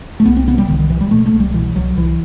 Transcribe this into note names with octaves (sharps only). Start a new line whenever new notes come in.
A3
C2 B3
C4
C3 B3
G3
C2 D#3
D#3
C3 E3
G3
B2 A3
A3
C2
G3
B2 E3
C2 F#3
C2 E3